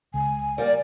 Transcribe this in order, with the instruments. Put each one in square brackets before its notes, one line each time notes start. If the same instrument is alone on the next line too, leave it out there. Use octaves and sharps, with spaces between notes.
[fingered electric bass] C#2 [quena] G#5
[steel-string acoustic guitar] G3 A#3 [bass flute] D5